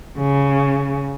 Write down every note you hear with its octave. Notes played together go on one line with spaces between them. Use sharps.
C#3